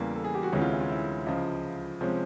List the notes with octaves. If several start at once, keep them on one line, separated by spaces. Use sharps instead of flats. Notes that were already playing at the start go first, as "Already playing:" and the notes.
Already playing: E2 C#3 E3 G3 A#3
A4
G#4
G4
F#4
D2 C3 E3 G#3 C#4
F4
E4
F4
E4
C#2 C#3 F3
C3 F3 G#3 C#4